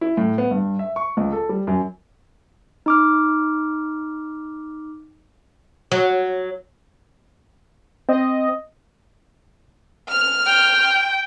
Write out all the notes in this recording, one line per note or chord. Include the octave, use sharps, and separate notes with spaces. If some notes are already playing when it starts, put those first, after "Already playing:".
E4
A2
B3
G2
E5
C#6
C#2
A4
G3
F#2
D#4 D6 F6
F#3
C4 D#5
F6
G5